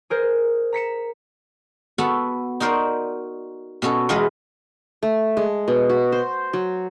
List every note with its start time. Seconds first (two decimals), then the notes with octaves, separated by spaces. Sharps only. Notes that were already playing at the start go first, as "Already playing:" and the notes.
0.10 G#4 A#4 C5
0.73 A#5 B6 C#7 E7
1.98 B3 F#4 A4 F#5 A5
2.60 D#4 F#4 A#4 C5 D5
3.82 B2 C#4 F#4 A4
4.09 E2 F#3 G#3 F4 B4 D#5
5.03 A3
5.37 G#3
5.68 B2
5.90 F#4
6.12 C5
6.53 F#3